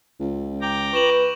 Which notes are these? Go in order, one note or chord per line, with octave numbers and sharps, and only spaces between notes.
C#2
G5 A#5 D6
B4 C#6 E7 F#7